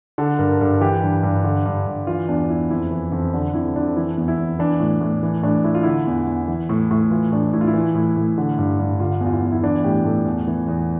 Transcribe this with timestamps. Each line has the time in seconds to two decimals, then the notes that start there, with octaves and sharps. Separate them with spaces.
0.18 D3 A4
0.39 G2 A#4
0.61 G2 A4
0.81 E3 G4
1.03 G2
1.23 G2
1.44 D3
1.66 G2
1.87 G2
2.07 E3 F4
2.29 E2 D4
2.49 E2 E4
2.70 F2 E4
2.91 E3
3.12 F2
3.33 D3 D4
3.54 F2 E4
3.76 F2 D4
3.96 E3 E4
4.18 E2
4.28 E4
4.39 E2
4.59 E3 D4
4.80 A2
5.01 A2
5.23 E3
5.43 A2 D4
5.64 A2 E4
5.74 F4
5.83 D3 E4
6.07 E2
6.27 E2
6.48 E3
6.69 A2
6.91 A2
7.11 E3 F4
7.32 A2 D4
7.53 A2 E4
7.61 F4
7.67 E4
7.74 E3
7.95 A2
8.17 A2
8.38 D3
8.58 G2
8.80 G2
9.00 D3 F4
9.21 E2
9.26 F4
9.32 E4
9.42 E2
9.52 E4
9.63 E3 D4
9.84 A2 G4
10.05 A2 A4
10.26 E2
10.47 E3
10.68 E2